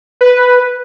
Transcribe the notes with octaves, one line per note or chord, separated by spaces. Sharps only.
B4